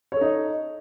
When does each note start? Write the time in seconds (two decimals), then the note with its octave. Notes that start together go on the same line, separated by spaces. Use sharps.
0.12 C#5
0.17 A4
0.21 D#4
0.26 D#5